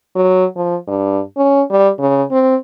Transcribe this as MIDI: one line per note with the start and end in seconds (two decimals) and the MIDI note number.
0.15 0.44 54
0.56 0.75 53
0.88 1.19 43
1.37 1.62 61
1.70 1.89 55
1.99 2.23 49
2.31 2.55 60